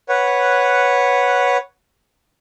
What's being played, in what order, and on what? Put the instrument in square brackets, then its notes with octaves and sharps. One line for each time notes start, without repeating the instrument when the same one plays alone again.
[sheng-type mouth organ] B4 C#5 F#5